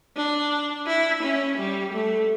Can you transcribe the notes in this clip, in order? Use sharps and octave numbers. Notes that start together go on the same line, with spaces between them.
D4
E4
C#4
G3
A3